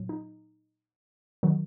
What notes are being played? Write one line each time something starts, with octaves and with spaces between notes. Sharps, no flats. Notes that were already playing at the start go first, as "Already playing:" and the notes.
Already playing: A#2 F#3
D#4
D#3 F#3